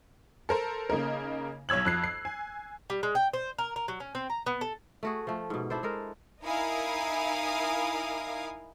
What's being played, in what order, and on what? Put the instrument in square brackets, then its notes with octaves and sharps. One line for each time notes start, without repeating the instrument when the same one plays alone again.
[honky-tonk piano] A4 A#4 C5
C#3 A#3 D#4 A#4
B1 C#5 E6 G#6 F#7
F2 F#6 C7
C7
G#5
[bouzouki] G3
G#3
G5
C5
A#4
A#4
F#3
C#4
C4
A#5
B3
A4
[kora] A3 F#4 G#4
F3 A3
G#2 B2
D4 E4 A4 C5
G#3 A4 A#4
[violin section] D#4 E4 A#4 F5 G#5 D#6